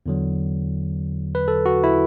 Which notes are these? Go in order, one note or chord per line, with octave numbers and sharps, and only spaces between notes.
E2 D3 F#3
B4
A4
F#4
E4